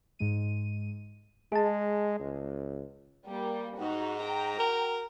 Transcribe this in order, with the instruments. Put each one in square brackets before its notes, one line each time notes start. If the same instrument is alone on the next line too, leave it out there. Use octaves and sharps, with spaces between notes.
[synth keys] G#2 G#3 D#7
[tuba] G#3 [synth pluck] G#4 A5
[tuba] C#2
[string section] G3 A#3
[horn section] G#2 [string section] D#4 F#4
[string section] G5 A#5
[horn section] F#4 A#4